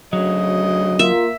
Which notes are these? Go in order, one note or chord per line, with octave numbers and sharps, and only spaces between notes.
D2 C#3 F#3 D#5
A#3 F4 E5